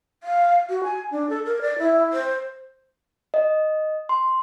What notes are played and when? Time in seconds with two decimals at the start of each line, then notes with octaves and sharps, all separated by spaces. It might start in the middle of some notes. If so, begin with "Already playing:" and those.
0.23 F5
0.69 F#4
0.84 G#5
1.11 D4
1.30 A4
1.46 A#4
1.62 D5
1.79 E4
2.13 C5
3.34 D#5
4.09 C6